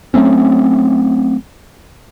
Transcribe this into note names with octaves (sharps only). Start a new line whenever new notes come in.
F#3 A3 C4 C#4